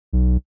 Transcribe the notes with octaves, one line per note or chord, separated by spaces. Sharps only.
B1